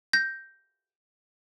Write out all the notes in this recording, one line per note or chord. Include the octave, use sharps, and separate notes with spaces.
G6 A#6